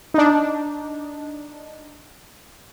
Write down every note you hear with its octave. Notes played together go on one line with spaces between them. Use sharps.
D4 D#4